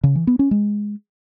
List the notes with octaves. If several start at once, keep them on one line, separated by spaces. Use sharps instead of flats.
C#3
E3
B3
C#4
G#3